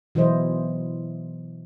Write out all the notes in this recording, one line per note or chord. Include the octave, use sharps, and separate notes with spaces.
B2 E3 F#3 E4 C5 D#5